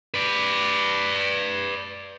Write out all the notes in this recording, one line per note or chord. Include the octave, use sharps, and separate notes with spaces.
B4 D5